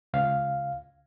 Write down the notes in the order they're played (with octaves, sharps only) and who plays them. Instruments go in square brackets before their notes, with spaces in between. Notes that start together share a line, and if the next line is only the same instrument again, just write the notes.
[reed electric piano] C#2 F5